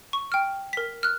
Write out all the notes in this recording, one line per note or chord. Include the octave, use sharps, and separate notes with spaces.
C#6
G5 F6
A#4 B6
F6 F#6